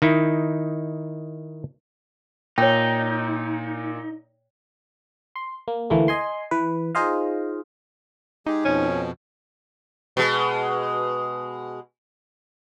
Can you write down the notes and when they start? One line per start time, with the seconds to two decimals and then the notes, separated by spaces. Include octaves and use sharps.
0.02 D#3 D#4 E4
2.58 A#2 D#4 C#5 G5
5.36 C6
5.68 A#3
5.90 D2 E3 A3 A#3
6.08 D#5 G#5 C6
6.51 E3 B4
6.95 D#4 F4 G#4 C5 D#5 F5
8.46 G#3 D#4 G4 G#4
8.65 F2 B2 F3 C#4
10.17 B2 G#3